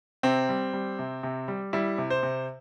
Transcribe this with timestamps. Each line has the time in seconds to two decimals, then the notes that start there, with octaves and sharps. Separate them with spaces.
0.23 C3 C4
0.49 G3
0.73 G3
0.99 C3
1.23 C3
1.48 G3
1.73 G3 E4
1.98 C3
2.10 C5
2.23 C3